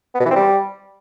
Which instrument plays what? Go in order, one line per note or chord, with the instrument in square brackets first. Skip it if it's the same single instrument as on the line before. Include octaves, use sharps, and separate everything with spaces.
[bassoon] B3
B2
E3
C4
G3